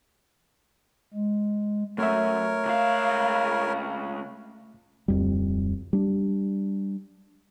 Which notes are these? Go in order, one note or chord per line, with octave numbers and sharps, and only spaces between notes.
G#3
F#2 A3 A#4 C#5 E5
C#2 F5
D1 F2 G3
G3 D4